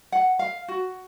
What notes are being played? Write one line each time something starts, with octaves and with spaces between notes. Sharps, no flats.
F#5
F5
F#4